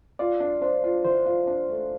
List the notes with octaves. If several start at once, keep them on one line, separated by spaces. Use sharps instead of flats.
F4 D5
D4
D4 C5
F4
E3 C5
F4
D4
A3